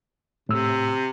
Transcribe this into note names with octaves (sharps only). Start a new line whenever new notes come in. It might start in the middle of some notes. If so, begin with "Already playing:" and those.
A2 C3 E6